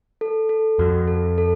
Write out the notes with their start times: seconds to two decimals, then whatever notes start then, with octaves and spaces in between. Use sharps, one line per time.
0.21 A4
0.49 A4
0.79 F2 F#4
1.08 A4
1.38 A4